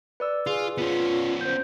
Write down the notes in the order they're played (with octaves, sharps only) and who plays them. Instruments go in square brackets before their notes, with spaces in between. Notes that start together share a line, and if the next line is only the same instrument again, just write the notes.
[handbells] B4 D5 E6
[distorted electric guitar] F4 [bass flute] G#4
[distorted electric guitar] B3 C#4 [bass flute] F4
[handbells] C5 G6